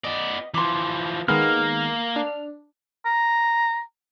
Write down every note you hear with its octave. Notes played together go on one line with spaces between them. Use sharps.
B3 D5 D#5
E3 F3 C6 D6
D#3 G#3 A#3 B3 F6
D4
A#5